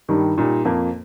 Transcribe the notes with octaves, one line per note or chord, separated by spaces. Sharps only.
G2 D#3 G3 D#4
A#2 G3 D#4
F2 F3 A#3